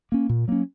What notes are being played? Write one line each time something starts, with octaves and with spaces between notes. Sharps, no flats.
A#3 C#4
A#2
F#3 A#3 C#4